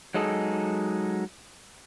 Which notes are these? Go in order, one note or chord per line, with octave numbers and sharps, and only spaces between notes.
F#3 G#3 D#4 G#4 A4